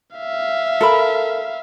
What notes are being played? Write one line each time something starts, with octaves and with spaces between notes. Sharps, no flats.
E5 F5
A4 A#4 B5